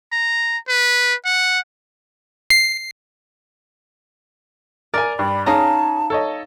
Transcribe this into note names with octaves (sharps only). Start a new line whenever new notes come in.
A#5
B4
F#5
C7
A#4 D5 G#5
G2 B5
C#4 D#4 G#4 F5 A5 A#5
A4 C#5 D#5